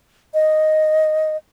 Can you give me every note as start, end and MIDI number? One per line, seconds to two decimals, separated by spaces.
0.34 1.37 75